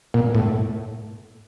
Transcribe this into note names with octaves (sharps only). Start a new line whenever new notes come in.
A#2
A2